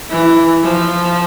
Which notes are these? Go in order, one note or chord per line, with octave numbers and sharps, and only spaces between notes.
E3
F3